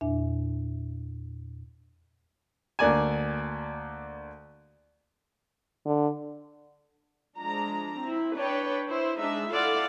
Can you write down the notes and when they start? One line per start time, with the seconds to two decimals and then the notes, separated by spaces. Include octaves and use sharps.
0.01 E2 A#2 D4 E5
2.79 D2 A#3 D5 G#5
5.85 D3
7.38 F3 G#3 D4 A#5
8.00 C4 E4
8.34 D4 B4 C#5 G5
8.87 E4 C5
9.18 G#3 D4 D#4 E5
9.51 E4 F4 A4 D5 F5 F#5